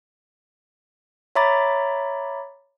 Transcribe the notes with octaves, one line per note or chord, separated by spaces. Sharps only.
C#5 E5 A#5 B5 D6 A6